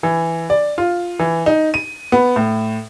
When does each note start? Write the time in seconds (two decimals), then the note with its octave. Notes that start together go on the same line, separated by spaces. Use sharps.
0.03 E3
0.50 D5
0.78 F4
1.19 E3
1.46 D#4
1.74 D#7
2.12 B3
2.36 A2